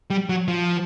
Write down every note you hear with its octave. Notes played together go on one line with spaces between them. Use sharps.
G3
F#3
F3